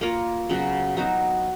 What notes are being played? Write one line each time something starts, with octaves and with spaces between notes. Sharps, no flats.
A#3 F4 A#4 C#5
C#3 F#3 B3 F#4
F#3 B3 D#4 F#4